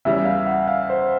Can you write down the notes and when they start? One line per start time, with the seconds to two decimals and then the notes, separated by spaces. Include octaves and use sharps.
0.05 E2 C#3 E3 G3 E5
0.25 F5
0.47 F#5
0.68 F5
0.90 C5